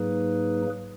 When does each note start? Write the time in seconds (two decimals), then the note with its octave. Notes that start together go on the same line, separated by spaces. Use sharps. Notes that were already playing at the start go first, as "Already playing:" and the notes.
Already playing: G#2 F#3 A#3 D#4 G#4 B4